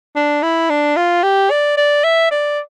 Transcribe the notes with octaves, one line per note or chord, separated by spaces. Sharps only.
D4
E4
D4
F4
G4
D5
D5
E5
D5